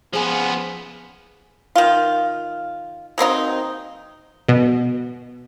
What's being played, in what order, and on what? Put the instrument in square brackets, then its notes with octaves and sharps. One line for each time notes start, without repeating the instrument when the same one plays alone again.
[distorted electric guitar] F3 B3 [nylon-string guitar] G#4 G#5
[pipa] D#3 F4
F#3 A#3 C4 D#4
[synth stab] B2